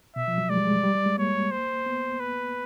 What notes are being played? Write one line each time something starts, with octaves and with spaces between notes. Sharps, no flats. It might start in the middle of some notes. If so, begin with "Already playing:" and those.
B2 E5
F3
F#3
G#3 D5
G3
G#3
G3
G3
G#3
A#3 C#5
C5
B3
B4